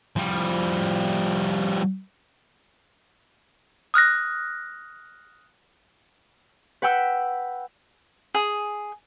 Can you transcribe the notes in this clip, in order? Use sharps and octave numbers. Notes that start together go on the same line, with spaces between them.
F3 G3
D#6 F6 F#6 A#6
B4 F#5 G5 E6
G#4